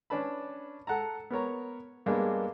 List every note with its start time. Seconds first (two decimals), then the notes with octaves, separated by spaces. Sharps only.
0.10 C#4 D4 B4 A5 B5
0.87 A4 F#5 A5 A#5
1.31 B3 A#4 C#5 A#5
2.06 G2 G#3 A#3 B3 D4